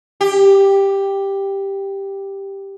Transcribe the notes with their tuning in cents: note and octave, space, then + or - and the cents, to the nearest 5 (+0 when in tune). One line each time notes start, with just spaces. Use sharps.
G4 +5